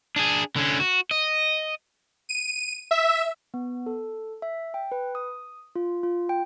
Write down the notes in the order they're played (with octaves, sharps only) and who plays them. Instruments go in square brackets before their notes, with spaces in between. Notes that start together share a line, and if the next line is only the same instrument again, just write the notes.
[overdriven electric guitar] D4 G#4
D3 C#4
F#4
D#5
[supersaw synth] D#7
E5
[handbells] B3
A4
E5
G5
B4
D#6
F4
F4
G5